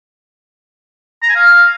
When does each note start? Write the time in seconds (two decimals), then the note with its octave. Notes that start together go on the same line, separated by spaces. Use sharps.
1.23 A#5
1.29 G#5
1.36 F5